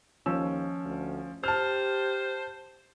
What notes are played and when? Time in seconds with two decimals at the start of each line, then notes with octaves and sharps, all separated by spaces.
0.26 D#2 F3 C#4 E6
0.85 D2
1.44 G4 C5 A5 F6